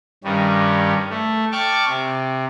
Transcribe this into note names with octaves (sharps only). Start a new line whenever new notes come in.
G2 D#3 G3 C#4
A3
D5 G5 A5 C#6 D6 F6
C3